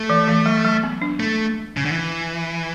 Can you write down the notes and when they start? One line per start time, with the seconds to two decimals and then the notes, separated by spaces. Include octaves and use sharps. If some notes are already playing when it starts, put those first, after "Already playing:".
Already playing: A3
0.10 E3
0.28 E3
0.46 F#3
0.65 F#3
0.83 B3
1.02 D4
1.20 A3
1.77 C#3
1.85 D3
1.92 E3